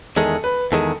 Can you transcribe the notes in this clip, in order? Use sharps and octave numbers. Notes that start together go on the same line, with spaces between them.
E2 D#3 G#3 A4
B4
E2 D#3 G#3 A4